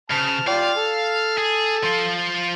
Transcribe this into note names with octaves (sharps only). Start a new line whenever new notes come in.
C#3 A5 F6
F4 D5 F5 G5
A4
G#4
F3 F4